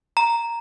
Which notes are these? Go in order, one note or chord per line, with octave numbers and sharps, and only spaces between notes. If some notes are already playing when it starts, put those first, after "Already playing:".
A#5